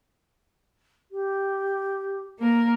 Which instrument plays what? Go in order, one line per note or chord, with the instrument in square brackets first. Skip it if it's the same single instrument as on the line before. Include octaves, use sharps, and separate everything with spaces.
[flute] G4
[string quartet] A#3 A#4